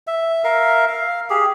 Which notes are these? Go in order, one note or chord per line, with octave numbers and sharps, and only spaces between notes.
E5
A#4 E5 F5
F5
G4 G#4